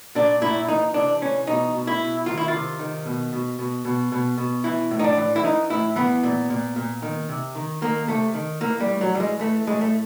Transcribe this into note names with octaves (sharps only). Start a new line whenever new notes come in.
A#2 D4
A#2 E4
E3 D#4
C3 D4
E3 C#4
B2 D#4
B2
E4
B2
D#3 F4
E4
F4
C3
D#3
B2
B2
B2
B2
B2
B2
E3 E4
A2
D#4
D4
E3
E4
E3 D#4
A2 E4
E3 B3
A#2
A#2
A#2
D#3
C3
D#3
D#3 A#3
C3 A3
D#3
E3 A#3
G3
A2
F#3
E3 G3
G#3
E3 A3
A2 G#3
A3